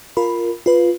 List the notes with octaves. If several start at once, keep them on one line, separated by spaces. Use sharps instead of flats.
F4 A#4 B5
F4 B4